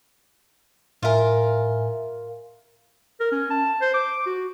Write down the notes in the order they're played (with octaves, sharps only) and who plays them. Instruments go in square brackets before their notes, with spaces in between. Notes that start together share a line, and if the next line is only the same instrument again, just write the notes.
[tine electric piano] A2 E5 G#5 [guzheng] F4 A#4
[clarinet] A#4
C#4
A5
C5
D6
F#4